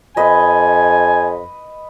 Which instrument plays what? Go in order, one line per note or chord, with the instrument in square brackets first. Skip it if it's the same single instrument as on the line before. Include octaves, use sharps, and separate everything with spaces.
[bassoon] F2 [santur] B4 D#5 [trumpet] G#5